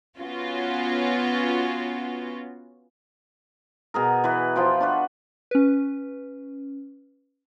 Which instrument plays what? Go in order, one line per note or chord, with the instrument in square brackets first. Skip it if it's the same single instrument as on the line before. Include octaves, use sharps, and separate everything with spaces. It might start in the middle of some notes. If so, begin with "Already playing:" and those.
[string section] B3 C#4 F4 F#4
[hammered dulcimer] B2 G#4 A#4
E3 B4
F3 F4 G5
D4 F#4 B4
[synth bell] C#4 B4